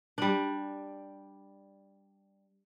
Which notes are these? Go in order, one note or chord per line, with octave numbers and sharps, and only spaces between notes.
G3 D4